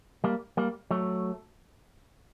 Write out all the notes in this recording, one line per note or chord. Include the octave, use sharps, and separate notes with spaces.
G3 A#3
G3 A#3
F#3 A3